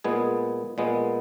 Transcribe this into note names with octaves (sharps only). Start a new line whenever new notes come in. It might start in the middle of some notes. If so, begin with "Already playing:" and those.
A#2 G#3 B3 G#4
A#2 G#3 B3